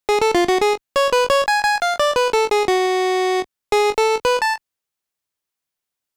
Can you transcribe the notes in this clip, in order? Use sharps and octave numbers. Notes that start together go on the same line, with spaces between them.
G#4
A4
F4
F#4
G#4
C#5
B4
C#5
G#5
G#5
F5
D5
B4
A4
G#4
F#4
G#4
A4
B4
A5